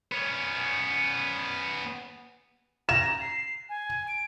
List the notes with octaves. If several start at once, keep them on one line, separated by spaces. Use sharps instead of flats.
B3 C#4
A#5 E7
C7
G#5
D7